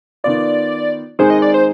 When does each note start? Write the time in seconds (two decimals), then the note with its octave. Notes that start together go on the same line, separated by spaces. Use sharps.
0.24 D#3 B3 F4 D5
1.19 D#3 G#3 C4 D#4 G#4 C5
1.30 D#5
1.42 D5
1.54 C5